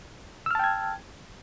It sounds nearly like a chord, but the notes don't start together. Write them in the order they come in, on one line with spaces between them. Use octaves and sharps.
E6 F6 A5 G5 G#6